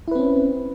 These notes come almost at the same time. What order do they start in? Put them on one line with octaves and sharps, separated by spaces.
E4 B4 C4 C#4